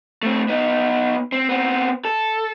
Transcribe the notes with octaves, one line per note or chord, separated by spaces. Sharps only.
A3 C4
B3 D#4
C4
B3 C4
A4